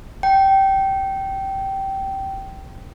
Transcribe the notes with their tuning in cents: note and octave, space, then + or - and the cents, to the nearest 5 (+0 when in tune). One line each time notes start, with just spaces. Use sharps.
G5 -15